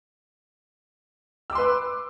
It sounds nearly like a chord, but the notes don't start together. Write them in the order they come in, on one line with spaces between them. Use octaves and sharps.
E6 D6 C6 B4